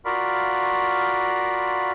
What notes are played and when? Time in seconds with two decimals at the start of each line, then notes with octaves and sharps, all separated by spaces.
0.05 F4 F#4 A#4 D5 F5 B5